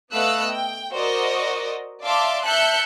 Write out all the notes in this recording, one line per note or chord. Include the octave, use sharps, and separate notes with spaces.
A3 B3 D#5 F5 E6 F#6
G5
F#4 A#4 C5 D5 D#5
D5 E5 F5 A5 C6 D6
E5 A5 F#6 G6 C#7